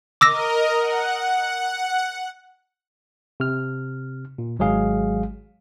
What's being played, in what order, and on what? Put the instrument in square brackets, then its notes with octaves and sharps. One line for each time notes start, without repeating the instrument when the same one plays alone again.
[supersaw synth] A#4 D#5 [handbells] D6 E6 A#6
[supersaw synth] F#5
[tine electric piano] C3 F6
A#2
G#1 F#3 G#3 G#4 F5